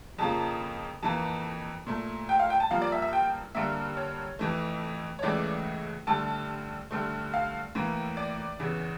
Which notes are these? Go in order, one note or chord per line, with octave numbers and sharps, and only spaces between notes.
F2 C#3 F3 A#3 A5
F2 E3 A#3 A5
A#2 A3
G5
F5
G5
A5
G2 F3 A#3 F5
D5
E5
E5
G5
G2 D3 G3 A#3 E5
C#5
F2 E3 A3
C#5
C#2 C#3 E3 A3 D5
G2 D3 A3 A5
G2 D3 A3
F5
A2 E3 A#3
D5
E2 C#3 E3